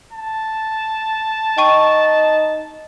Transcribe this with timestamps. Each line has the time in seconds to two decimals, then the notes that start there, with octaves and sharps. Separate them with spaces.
0.13 A5
1.58 D#4 G5 C#6 D#7